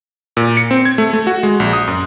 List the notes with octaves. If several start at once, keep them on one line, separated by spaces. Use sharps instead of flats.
A#2
C#7
C4
G#6
A3
A3
F#4
G#3
A#1
D#6
F#2